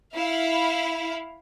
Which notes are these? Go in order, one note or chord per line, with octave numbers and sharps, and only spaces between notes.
E4 F5